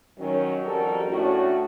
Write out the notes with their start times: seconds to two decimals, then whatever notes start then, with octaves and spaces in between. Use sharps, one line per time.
0.19 D#3 F#3 C#4
0.63 F2 G3 F#4 A4 A#4
1.09 A2 A3 C#4 D4 F#4